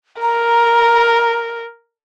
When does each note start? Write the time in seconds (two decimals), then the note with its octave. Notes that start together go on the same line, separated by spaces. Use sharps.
0.22 A#4 A#5